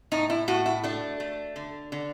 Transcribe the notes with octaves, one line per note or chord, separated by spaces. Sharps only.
A2 D#4
E4
A2 F#4
E4
A3 D4
A3
D3
D3